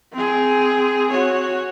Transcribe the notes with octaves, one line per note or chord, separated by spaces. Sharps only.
C4 G#4
F#4 C#5